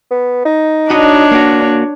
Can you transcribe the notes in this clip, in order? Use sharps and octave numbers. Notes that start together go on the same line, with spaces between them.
B3
D#4
D4 F#4 C#5 D#5
A#3 F#4